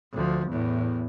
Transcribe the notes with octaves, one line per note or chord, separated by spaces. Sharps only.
D2 F3
E2 A2